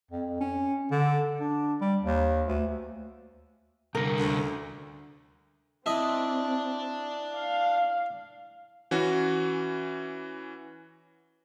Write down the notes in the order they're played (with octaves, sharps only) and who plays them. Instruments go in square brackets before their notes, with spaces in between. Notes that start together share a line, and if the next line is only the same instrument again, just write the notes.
[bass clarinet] F2
C#4
D3
D4
G3
D#2
D2
[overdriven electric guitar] C2 D3 [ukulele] A#4
[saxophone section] D2
[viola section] C4 [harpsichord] E4 D#5 [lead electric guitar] D5 A5
[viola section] F5
[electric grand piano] E3 C#4 F#4